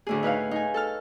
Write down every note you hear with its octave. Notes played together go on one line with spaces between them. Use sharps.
D2 A2 G#4
D#4 B4 C#5 F5
D#4 G#5
A4 A5 F6